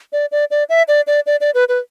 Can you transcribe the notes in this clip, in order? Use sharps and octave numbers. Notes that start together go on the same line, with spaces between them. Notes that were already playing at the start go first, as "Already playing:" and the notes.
D5
D5
D5
E5
D5
D5
D5
D5
B4
B4